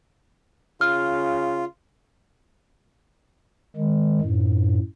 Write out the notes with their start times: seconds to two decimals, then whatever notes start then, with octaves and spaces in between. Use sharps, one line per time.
0.81 C#3 F4 F6
3.76 D#3 G#3
4.21 F#2 A2